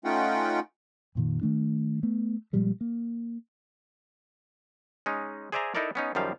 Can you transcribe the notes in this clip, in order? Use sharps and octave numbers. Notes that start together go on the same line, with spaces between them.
A3 C#4 D#4 F4 F#5 G5
F2 A#2 D#3
D#3 A3 D4
A3 B3
A#2 F3 G3 G#3
A#3
G#3 C#4 D#4
G#4 C5 D5 E5 G#5 A#5
D#4 E4 A4 A#4 D5
B3 C#4 D#4
F#2 D#3 F3 G3 F5